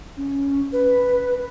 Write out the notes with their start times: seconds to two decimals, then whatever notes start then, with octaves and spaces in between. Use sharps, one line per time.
0.17 C#4
0.73 B4